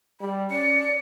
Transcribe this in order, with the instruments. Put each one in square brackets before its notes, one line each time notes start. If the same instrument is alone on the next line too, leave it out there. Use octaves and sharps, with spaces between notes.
[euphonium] G3 [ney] B5
[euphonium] C#4 [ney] D5 [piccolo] C#7